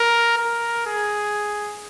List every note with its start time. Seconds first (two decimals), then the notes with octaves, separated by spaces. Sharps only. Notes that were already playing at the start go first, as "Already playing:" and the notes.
Already playing: A#4
0.38 A#4
0.86 G#4